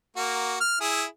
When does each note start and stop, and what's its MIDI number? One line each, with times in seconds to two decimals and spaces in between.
0.17 0.56 58
0.17 0.56 66
0.60 0.79 89
0.81 1.04 64
0.81 1.04 68